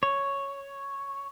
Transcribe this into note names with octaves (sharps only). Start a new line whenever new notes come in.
C#5